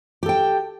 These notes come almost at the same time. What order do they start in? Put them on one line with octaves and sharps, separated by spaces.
G4 A4 G5